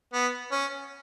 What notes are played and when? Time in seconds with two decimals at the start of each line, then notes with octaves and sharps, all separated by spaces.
0.13 B3
0.52 C#4